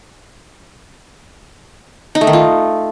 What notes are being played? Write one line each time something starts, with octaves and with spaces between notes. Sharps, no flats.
D#4
A3
D#3
F4